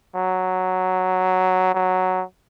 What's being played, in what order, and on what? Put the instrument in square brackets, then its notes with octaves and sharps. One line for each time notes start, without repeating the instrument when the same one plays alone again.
[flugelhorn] F#3
F#3